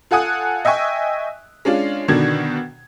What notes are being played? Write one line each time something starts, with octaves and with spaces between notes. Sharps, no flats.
F4 A4 F#5 G#5 D#6 F#6
D#5 E5 G5 G#5 C#6
G#3 C#4 D4 F4
B2 D3 D#3 D4 F#4 G#6